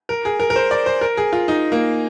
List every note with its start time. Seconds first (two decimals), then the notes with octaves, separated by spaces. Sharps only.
0.09 A#4
0.25 G#4
0.40 A#4
0.50 A#4
0.56 C5
0.71 D5
0.86 C5
1.01 A#4
1.17 G#4
1.33 F4
1.48 D#4
1.72 A#3